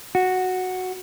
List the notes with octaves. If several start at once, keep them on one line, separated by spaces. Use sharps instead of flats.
F#4